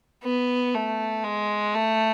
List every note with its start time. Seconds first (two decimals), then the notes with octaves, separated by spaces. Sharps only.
0.24 B3
0.74 A3
1.24 G#3
1.75 A3